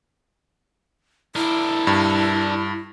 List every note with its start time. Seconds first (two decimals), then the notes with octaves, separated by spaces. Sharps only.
1.36 D4 E4 A#4
1.87 G2